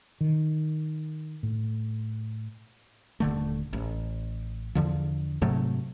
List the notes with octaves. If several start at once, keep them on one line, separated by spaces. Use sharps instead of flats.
D#3
A2
D#1 D3 A3
A1
E2 D3 F3
G#2 C3 F#3 A3